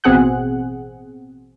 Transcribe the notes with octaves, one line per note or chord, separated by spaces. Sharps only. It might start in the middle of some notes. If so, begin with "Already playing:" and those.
A1 B2 C4 G#4 F#5 F#6